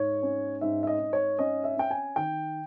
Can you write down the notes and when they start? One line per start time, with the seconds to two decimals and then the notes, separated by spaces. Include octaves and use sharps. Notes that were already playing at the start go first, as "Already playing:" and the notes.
Already playing: G#2 C#5
0.23 C#4
0.61 G#2 E5
0.83 E5
0.87 D#5
1.00 G#2
1.13 C#5
1.39 C#4 D#5
1.64 E5
1.77 C#4 G5
1.91 G#5
2.16 D#3 G5